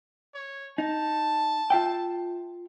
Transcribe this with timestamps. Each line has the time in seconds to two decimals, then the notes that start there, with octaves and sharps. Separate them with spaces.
0.35 C#5
0.78 D#4 A5
1.70 F4 E5 G5